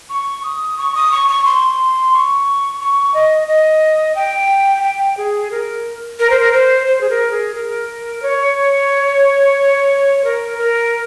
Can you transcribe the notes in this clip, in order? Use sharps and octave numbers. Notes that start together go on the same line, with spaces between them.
C#6
D#6
C#6
D#6
C#6
C#6
C6
C#6
C#6
D#5
D#5
G5
G5
G#4
A#4
A#4
C5
A#4
C5
C5
G#4
A#4
G#4
A#4
C#5
A#4
A#4